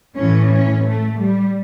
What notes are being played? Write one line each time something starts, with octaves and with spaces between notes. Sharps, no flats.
A2 E3 C#4
C#4
A3
G3